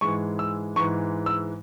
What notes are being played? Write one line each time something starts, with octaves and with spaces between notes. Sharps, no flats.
G#2 E3 G#3 C#6
E6
G#2 E3 G#3 C#6
E6